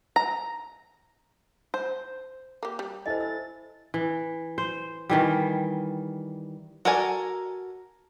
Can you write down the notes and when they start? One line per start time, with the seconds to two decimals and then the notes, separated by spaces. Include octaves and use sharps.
0.16 A#5
1.74 C5
2.63 A#3 G4
2.79 G3
3.06 E4 A4 C5 D#5 G#5 A6
3.20 E6 A6
3.94 E3
4.58 C5
5.09 D#3 E3 G3
6.85 F#4 A4 A#4 D5 G#5